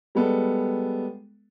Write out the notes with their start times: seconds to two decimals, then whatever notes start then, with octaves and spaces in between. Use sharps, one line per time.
0.15 G3 G#3 B3 A4